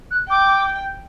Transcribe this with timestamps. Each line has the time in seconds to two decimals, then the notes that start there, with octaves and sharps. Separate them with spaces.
0.11 F#6
0.29 G5 D6